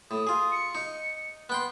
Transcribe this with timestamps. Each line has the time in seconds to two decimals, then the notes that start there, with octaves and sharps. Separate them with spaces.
0.11 A2 D#6
0.27 F4 G#4
0.52 C#7
0.75 D#4
1.50 B3 G5 C6 F#6